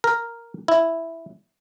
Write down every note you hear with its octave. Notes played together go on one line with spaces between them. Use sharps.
A#4
E4